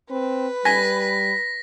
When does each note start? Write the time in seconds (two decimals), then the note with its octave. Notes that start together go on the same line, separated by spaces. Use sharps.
0.10 C4 B4
0.65 G3 G#5 A#6 B6